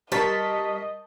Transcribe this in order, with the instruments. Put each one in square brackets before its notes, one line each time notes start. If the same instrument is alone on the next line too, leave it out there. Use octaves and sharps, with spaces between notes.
[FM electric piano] G3 B6 [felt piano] A#4 C5 C#6 [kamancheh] D#5 [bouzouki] A5